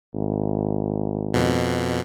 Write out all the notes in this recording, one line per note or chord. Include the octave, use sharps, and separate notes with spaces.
G#1
F2 B2